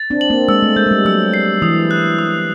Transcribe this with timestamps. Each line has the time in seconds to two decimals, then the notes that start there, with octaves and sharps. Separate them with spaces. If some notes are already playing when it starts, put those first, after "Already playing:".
Already playing: A6
0.10 C4 D4
0.21 F#7
0.30 A#3 C4
0.48 G#3 E6
0.63 A3
0.76 G#3 G6
0.87 G#3
0.91 G3
1.05 F#3 E6
1.34 C7
1.62 E3 D#6
1.91 F#6
2.19 D#6